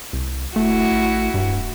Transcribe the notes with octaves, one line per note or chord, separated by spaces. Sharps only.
C2
F1 A3 E4 F#4
A1
D1 G2